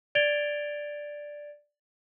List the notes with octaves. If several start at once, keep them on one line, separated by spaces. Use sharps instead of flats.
D5 G#6 A6 D7 F7 G7